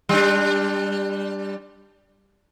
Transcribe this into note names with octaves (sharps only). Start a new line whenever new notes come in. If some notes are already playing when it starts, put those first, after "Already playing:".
G3 D4